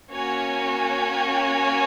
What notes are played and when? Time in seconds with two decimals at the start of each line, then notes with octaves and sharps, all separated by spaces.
0.13 A#3 C#4 F#4 C#5 G#5